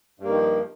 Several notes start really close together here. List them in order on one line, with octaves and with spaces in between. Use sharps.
G2 A#3 D#3 F3